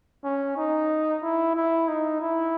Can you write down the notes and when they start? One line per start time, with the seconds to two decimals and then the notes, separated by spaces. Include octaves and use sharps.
0.24 C#4
0.57 D#4
1.23 E4
1.55 E4
1.88 D#4
2.21 E4